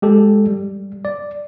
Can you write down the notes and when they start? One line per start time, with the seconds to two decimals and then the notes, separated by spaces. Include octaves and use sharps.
0.02 G#3 G4 A4
0.47 G3
1.05 D5